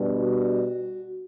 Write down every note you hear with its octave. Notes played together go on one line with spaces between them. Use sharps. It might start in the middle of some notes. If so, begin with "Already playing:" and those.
Already playing: B2 G3 D4
F#4